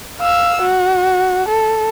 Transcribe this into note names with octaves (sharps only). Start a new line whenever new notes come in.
F5 E6
F#4
A4